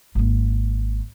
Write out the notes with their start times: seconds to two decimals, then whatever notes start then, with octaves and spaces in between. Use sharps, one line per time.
0.15 G#1 A#3